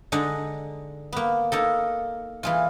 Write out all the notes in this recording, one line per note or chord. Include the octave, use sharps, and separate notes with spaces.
D3 G#3 D4 D#4
A#3 B3
A#3 D#4 A4
E3 G#3 F4